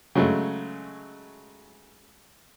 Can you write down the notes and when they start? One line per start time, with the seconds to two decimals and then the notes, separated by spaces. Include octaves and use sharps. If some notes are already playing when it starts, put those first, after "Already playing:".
0.15 C#3 F#3 G#3 A3